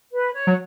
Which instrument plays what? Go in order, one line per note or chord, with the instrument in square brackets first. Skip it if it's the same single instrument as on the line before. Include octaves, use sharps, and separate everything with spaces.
[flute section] B4
C#5
[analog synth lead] F#3